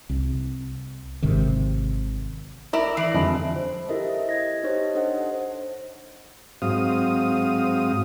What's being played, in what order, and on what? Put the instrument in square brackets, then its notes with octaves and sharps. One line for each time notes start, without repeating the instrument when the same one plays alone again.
[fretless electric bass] C2
G#1 G#2 C3 D#3
[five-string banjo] E4 E5 [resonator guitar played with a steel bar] A#4 D5
[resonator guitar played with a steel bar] E3 [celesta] C7 D7 F#7
[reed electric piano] F2 D3 G3 [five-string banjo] G#3 [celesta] E5 A5 B5
[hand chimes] C5
E4 G4 A4 A#4 D#5 E5
D#5 G#6 A#6
D#4 G4 C5 C#5 D#5
D4 A4 C5 D#5 F#5
[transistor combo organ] G#2 F#3 C4 F5 D#6